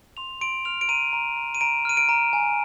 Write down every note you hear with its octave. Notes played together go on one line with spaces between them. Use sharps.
C6 F7
C6 D7
F6 F7
D7
A#5 D#7
A#5
A#5
D#7
A#5 D7
F6 D#7
D7
A#5
G#5